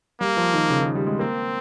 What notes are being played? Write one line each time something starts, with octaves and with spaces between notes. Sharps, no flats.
G3 A#3
F3
D#3
C#3
D#3
G3
G#3
A#3 C4